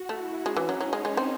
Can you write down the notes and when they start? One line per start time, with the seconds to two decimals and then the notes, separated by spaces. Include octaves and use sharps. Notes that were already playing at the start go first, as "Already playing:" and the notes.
Already playing: F#4
0.09 A3 E4
0.45 G#3 C#4
0.57 E3
0.69 F#3
0.81 F#3 D#4
0.93 G#3
1.05 G#3
1.17 C4